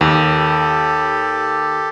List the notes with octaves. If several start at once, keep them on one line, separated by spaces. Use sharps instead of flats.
D#2 G4 A4